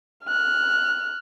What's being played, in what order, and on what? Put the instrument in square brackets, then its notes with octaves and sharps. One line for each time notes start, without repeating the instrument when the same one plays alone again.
[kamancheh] F6 F#6